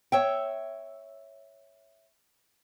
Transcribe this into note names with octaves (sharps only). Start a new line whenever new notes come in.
C#5 E5 G5